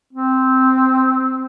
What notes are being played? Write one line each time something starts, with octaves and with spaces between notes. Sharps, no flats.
C4